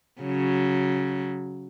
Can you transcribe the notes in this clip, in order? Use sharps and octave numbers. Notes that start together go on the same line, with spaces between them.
C#3 F#3